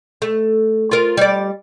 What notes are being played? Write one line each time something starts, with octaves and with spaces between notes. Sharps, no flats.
A3
F4 A#4
G3 D5